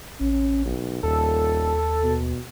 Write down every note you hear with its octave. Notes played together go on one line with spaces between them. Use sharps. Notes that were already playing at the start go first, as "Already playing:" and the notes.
A1 C#4
B1
D#1 D#2 A4
B2